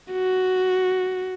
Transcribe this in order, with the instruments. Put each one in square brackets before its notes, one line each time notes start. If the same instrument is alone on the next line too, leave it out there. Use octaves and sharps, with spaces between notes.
[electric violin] F#4